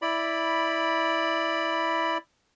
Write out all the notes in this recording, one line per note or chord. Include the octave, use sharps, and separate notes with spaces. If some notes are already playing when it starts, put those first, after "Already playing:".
E4 D5 B5